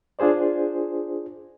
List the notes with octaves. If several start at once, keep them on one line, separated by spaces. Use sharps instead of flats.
D4 F4 G#4 C5 D5